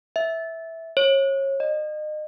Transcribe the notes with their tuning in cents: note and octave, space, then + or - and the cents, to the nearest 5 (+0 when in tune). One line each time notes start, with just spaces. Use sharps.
E5 -10
C#5 -25
D#5 -35